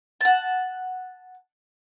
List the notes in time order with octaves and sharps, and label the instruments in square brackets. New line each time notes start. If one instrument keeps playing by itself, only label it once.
[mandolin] F#5 A5